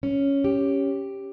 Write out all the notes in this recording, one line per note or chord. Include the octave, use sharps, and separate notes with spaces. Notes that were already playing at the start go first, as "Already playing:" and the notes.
C#4
G4